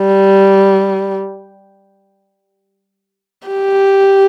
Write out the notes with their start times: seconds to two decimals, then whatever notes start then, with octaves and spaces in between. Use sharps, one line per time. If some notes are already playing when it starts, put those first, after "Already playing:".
Already playing: G3
3.47 G4